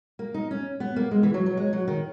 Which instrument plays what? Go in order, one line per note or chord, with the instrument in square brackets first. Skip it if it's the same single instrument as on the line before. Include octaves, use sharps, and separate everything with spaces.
[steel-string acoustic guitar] A#3
D#4
C#4
B3
A#3
G#3
E3
F#3
F#3
G#3
F#3
D#3